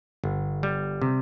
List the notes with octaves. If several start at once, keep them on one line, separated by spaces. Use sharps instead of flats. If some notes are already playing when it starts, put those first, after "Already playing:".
G1
G3
C3